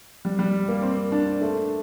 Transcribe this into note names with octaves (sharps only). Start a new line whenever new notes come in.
G3
G3
A#3
C4
D4
A3